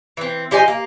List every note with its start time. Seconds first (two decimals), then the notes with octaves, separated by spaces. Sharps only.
0.17 E3 C4
0.51 F3 G4 D#5 G#5
0.68 A#3